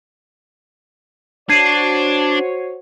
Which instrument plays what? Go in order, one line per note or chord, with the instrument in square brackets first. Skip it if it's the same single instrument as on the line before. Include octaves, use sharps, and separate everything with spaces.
[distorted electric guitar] D4 [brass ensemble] F#4 C5 C#5 [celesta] G#6 C7 D#7